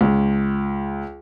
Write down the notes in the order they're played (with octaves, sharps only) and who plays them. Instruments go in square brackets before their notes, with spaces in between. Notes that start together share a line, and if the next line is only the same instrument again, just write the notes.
[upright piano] C#2